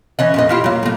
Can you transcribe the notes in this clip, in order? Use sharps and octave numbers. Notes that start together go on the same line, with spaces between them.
E3 C#4 D#5
F2 A#2 D#5
E4 F4 G4
F#3 A#3
A2 A#3